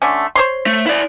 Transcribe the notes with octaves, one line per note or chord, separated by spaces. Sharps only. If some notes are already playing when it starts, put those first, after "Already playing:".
D3 A3 C#4
C5 C#5 C6
A3
E4 D5